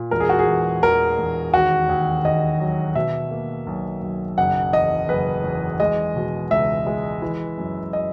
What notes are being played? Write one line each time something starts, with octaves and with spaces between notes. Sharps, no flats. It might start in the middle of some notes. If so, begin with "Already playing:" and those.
Already playing: A#2
E1 A#4
G#4
F#4
G#4
E2
E1 A#4
E1
D#2 F#4
D#2
D#2 D#5
F#3
B2 E5
A#3
B1
B1
F#1 F#5
E2 D#5
F#1 B4
E2
G#3 D#5
B2
C#2 E5
G#3
E3
F#2
D#5